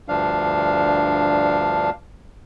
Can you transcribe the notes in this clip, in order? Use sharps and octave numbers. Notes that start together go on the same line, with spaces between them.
D2 G2 F3 D4 F5